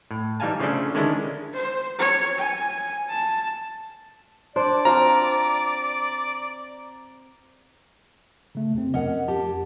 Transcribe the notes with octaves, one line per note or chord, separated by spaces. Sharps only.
A2
E3 G3 D#4 F5 G#5 A5
C#3 F3 A3 C#4 D4 A4
D3 D#3 G#3 C#4 D4 E4
C5
C#5
G#5
A5
D4 C5 D5
C4 F4 C5 A#5
C#3 A3
F2 C3 C4
F2 C#4 A#4 D#5 F#5
G4 A5